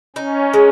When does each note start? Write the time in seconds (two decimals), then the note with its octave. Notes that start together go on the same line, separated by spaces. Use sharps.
0.16 C#4 D#4
0.53 G#3